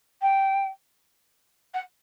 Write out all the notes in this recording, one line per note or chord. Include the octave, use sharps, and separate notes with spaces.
G5
F#5